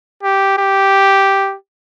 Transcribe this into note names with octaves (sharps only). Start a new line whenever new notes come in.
G4
G4